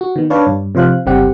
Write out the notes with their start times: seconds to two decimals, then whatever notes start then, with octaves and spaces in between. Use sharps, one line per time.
0.01 F#4
0.16 D#3 B3
0.30 D4 B4 C#5 D5 F5 A5
0.46 G2
0.75 C3 F3 C5 F5 F#6
1.06 G1 C#2 G3 C4 G4 F#5